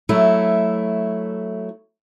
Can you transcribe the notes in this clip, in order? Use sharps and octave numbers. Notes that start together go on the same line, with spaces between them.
F#3 A3 E4